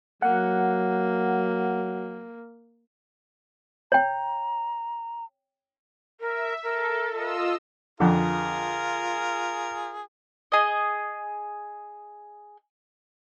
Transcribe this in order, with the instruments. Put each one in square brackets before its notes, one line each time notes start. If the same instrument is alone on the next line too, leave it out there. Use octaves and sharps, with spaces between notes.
[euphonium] F#3 [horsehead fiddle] A#3 [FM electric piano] F#5
[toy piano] C#5 G5 [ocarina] A#5
[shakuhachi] A#4 [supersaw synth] E5
[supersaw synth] A4 [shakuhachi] A#4
[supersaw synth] F4 D#5 E6
[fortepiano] F2 D3 [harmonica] F4 G#4 A#4
[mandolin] G#4 D#5